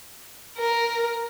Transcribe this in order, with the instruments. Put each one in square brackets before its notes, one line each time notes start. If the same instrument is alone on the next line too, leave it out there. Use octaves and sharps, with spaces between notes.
[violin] A#4